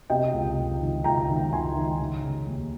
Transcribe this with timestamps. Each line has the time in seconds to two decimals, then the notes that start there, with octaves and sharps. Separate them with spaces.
0.10 C3 D#5 G5
0.33 C#2
0.58 C#2
0.81 D#3
1.04 C#2 G5 A#5
1.28 D#3
1.52 C#2 G#5 C6
1.75 D#3
2.00 C#3
2.23 C#3
2.47 D#2